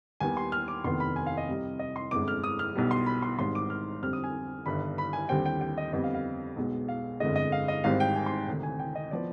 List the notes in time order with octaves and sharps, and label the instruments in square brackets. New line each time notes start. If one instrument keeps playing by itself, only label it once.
[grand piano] D#2 D#3 G3 B3 G#5
C6
F6
D6
F1 D#2 D#3 B3 C6
B5
G#5
F5
D#5
C2 C3 G3
D#5
C6
G1 F2 D3 G#3 D6
F6
D#6
F6
B1 B2 G3
C6
B5
C6
G#1 G#2 G3 C6
D6
F6
F2 D3 G3 C4 F6
D#6
G#5
G1 G2 D#3 B5
B5
G#5
D#2 D3 G3 C4 G5
G5
G5
D#5
F2 D3 G3 B3 D#5
F5
F5
B1 B2 G#3
F5
G1 F2 D3 G#3 D#5
D#5
F5
D#5
G#1 G#2 G3 C4 F5
G5
G#5
C6
D2 C3 D#3
G#5
G5
D#5
F3 B3 D5